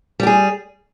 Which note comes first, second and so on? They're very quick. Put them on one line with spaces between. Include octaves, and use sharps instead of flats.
G3 G4 G#4